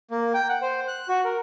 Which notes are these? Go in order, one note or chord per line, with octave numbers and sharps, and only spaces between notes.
A#3
G5
F#5
C5
F#6
F#4
A#4